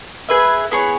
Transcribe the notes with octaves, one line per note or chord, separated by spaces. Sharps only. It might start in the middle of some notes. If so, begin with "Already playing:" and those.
G#4 B4 E5
B3 E4 G#4 C#5